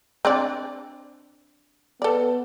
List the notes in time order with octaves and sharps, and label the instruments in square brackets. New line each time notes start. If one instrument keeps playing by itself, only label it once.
[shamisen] C4 D4 D5
[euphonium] B3 [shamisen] A4 D5